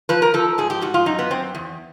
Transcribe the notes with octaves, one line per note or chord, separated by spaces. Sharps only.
F3 B4
A#4
F3 A4
G#2 G#4
G4
G#2 F#4
F4
F#2 D#4
B3
F#2 C4
E2